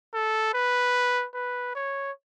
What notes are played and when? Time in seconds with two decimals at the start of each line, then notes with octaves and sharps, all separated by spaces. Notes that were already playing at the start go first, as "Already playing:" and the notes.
0.14 A4
0.54 B4
1.34 B4
1.75 C#5